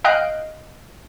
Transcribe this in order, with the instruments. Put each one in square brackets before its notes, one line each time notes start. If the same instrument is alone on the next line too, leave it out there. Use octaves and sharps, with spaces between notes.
[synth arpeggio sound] D#5 F5 G5 F#6 C7 D7